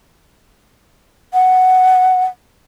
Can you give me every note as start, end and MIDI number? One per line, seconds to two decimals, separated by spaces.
1.33 2.25 78